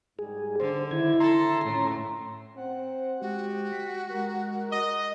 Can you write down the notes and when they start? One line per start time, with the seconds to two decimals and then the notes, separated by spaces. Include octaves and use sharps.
0.19 G#2 G3 G#4
0.60 D3 C5
0.91 D#3 E4 G#6
1.20 A4 A#5 C6
1.64 F2 A2 C#4
2.56 C4 F#5
3.22 G#3 F#4 G4
3.72 B6
4.11 G#3 A#4
4.72 D#5